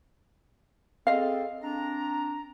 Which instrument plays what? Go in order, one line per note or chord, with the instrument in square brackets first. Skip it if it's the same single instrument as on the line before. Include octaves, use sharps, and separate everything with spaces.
[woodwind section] C4 G#4 A4 [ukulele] D#5 F5
[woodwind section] C4 D4 A#5